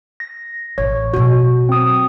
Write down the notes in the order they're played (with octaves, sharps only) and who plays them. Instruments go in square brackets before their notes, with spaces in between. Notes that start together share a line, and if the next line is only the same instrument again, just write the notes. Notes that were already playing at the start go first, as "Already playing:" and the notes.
[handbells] A#6
[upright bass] A1 [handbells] C#5
[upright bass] B2 F#3 [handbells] F#4
[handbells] C4 D#6